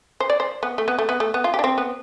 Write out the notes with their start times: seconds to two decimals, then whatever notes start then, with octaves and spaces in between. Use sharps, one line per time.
0.20 C5
0.30 D5
0.40 C5
0.63 B3
0.78 A3
0.88 B3
0.98 A3
1.09 B3
1.20 A3
1.34 B3
1.44 F4
1.54 G4
1.59 D4
1.64 C4
1.78 B3